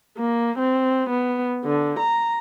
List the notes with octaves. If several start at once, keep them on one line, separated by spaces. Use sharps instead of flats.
A#3
C4
B3
D3
A#5